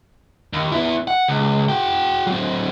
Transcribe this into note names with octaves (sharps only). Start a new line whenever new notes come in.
D#2
B3 E4
F#5
C#2
F#4 G5
F#3 C4